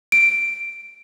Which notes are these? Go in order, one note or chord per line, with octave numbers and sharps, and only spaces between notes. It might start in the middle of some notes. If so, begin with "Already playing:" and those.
D7